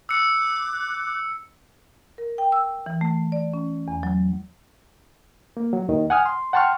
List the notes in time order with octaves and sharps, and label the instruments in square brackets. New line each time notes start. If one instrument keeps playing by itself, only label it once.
[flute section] D6 F#6 [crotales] E6 C#7
[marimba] A#4
G5
E6
E3
A3
D5
C#4
E2
F#3
[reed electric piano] A#3
F#3
D#2 D#3
F#5 G#5 D#6 F6
C6
F#5 G5 A5 C6 C#6 F6